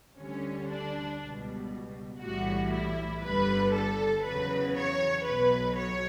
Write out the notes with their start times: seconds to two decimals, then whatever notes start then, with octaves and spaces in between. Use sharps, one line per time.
0.19 D2 D3 G3 C#4
0.70 D4
1.21 C#2 B2 G3
2.22 B1 A2 E3 G3 F#4
2.73 E4
3.23 G1 G2 D3 G3 B4
3.75 A4
4.25 E2 C#3 F#3 B4
4.76 C#5
5.26 B1 B2 F#3 B4
5.78 C#5